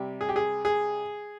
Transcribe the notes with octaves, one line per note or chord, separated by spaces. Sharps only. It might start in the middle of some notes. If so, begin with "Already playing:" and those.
Already playing: C3 G3
G#4
G4
G#4
G#4